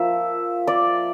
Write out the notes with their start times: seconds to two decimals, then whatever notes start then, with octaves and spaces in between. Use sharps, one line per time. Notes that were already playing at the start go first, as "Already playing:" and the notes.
Already playing: F3 A#3 E5
0.67 D5